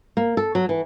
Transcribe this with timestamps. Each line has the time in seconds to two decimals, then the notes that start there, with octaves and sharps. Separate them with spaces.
0.17 A#3
0.37 A4
0.55 F#3
0.69 E3